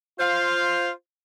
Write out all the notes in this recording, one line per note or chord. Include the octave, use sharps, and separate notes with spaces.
F4 C5 F5